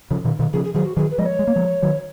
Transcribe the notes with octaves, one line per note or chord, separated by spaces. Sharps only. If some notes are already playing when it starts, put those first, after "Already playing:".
C#3 F3
B2 D#3
B2 D#3
C#3 F3 G#4
G#4
D#3 F#3 G#4
F#4
D#3 F#3 G#4
B4
F3 G#3 D#5
C#5
G#3
A#3
F3 G#3
D#3 F#3